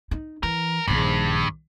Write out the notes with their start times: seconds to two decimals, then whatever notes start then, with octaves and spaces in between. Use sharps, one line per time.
0.11 D#4
0.43 E3 A#4
0.88 A#1 G2 D#3